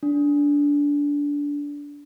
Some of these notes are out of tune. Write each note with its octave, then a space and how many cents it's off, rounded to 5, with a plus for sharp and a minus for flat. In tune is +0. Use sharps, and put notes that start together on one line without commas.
D4 -20